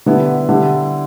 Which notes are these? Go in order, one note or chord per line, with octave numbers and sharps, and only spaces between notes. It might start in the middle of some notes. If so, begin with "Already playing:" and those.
D3 G3 B3 E4
D3 G3 E4